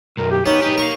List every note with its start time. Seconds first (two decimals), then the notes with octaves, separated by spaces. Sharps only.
0.18 B1 F#2 A#4
0.31 G4
0.46 B3 C#4 D#4
0.62 D#4 G4 B4
0.78 A#4 F5 C#6